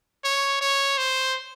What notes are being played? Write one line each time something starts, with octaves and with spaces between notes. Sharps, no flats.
C#5
C#5
C5